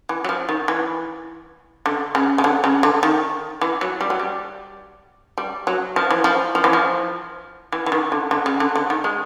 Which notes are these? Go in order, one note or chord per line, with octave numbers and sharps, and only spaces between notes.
E3
F#3
F3
D#3
E3
D3
C#3
C#3
D3
C#3
D3
D#3
E3
F#3
G3
F#3
G3
G3
F#3
F3
E3
F3
F3
E3
F3
E3
E3
D#3
D3
D3
C#3
D3
D3
D#3
G#3